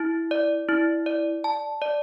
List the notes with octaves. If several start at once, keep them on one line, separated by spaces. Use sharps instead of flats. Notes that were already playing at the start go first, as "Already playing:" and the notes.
Already playing: E4
D5
E4
D5
A5
D5